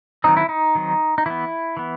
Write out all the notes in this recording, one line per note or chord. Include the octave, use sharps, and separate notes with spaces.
D#3 F#3 C4 D#4
E4
D#4
D#3 F#3 C4
D#4
E3 B3 E4
E3 B3